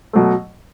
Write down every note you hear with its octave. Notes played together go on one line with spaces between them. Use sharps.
B2 F#3 A3